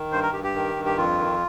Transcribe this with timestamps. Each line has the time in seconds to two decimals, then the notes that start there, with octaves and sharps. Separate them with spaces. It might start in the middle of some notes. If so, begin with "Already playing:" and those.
Already playing: D#3
0.12 G2 C5
0.23 A#4
0.33 G2 G4
0.44 G4
0.54 D#3
0.76 G2
0.86 G4
0.97 F2 F4
1.18 D#3